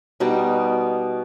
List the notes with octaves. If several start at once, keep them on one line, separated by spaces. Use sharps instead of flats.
B2 G3 D#4